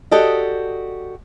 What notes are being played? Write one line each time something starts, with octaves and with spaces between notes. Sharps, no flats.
F#4 G4 A4 D5 D#5